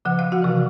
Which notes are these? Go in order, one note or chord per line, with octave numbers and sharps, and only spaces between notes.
C#3 F3 F#5
F5
F#4 F#5
C3 E3